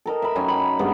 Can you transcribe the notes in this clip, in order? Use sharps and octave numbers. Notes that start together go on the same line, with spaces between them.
A4 A#4 D#5
E5 B5
F#2 D#4 G#5
B5
G2 G#3 B3